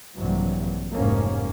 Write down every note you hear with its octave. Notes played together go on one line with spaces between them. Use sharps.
A#1 G2 C3 E3 F#3
F1 G#2 A#3 C#4